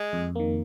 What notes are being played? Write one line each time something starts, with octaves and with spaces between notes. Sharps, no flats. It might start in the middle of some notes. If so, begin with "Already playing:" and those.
Already playing: G#3
F2
D#3 A#3